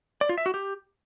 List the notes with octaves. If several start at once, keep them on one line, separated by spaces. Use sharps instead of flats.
D5
F4
E5
F#4
G4